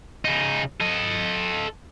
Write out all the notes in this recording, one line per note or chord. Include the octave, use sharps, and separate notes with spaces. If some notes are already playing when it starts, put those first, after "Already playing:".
C#3 D#4
A4 D#5